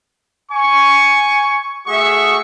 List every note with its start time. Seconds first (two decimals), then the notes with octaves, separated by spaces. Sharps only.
0.50 G#5 C#6
1.87 A3 F#4 G#4 E5 C#6